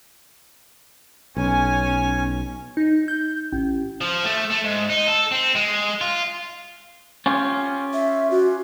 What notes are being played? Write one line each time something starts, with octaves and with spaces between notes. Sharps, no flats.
B1 C#4 G#5
D#4
G6
A1
F3
A3
A3
G#2
D#4
A4
C4
G#3
F4
C#4 F4 G4
E5
F#4